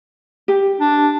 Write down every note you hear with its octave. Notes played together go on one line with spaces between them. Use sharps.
G4
D4